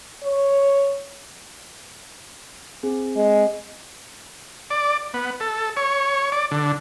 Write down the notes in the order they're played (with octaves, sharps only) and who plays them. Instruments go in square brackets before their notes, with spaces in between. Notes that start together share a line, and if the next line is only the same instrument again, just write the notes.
[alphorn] C#5
[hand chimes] C4 G#4
[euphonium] G#3
[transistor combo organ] D5
B3
A4
C#5
D5
D3